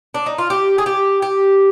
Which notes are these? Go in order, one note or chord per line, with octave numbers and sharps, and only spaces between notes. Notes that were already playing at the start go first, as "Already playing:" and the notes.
D4
D#4
F4
G4
G#4
G4
G4